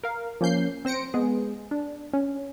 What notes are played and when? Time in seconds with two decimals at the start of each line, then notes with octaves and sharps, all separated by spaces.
0.04 A#4 F5
0.41 F3 A#3 C#4 G6 C7
0.85 C4 C5 A#6 C#7 D7
1.14 G#3 B3 G#4
1.71 D4
2.13 C#4